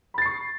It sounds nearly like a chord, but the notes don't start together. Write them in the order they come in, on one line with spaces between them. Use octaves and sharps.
B5 A6 C7 C#6